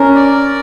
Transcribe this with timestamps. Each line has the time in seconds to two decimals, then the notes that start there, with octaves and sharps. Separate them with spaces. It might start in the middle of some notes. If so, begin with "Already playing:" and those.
Already playing: C#4 A#4
0.15 D5